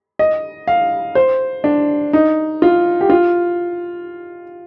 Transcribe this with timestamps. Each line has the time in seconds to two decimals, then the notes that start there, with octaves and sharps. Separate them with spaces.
0.19 D#5
0.67 F5
1.15 C5
1.64 D4
2.13 D#4
2.62 F4
3.01 G4
3.10 F4